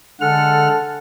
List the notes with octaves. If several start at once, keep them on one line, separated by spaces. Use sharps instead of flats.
D3 G#3 A4 F#5 F6